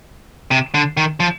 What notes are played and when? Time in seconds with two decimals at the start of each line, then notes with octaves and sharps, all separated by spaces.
0.51 C3
0.74 D3
0.97 D#3
1.20 F3